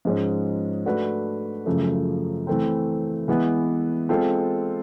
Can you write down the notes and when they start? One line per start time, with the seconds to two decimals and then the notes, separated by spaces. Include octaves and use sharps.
0.05 G#2 F3 G#3 C#4
0.86 A3 D4 F#4 B4
1.66 F#2 C#3 F3 A3
2.47 E3 A3 C4
3.28 E3 G#3 B3
4.09 G#3 C4 F4 A4